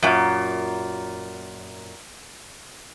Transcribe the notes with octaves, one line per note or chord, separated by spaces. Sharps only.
F#2 A#2